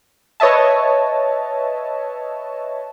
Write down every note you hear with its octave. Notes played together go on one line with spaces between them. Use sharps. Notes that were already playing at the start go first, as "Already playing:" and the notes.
B4 C#5 D#5 E5 A5